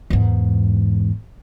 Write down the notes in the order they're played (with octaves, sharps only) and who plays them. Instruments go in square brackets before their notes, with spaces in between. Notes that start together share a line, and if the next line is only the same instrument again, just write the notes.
[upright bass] E2 G#2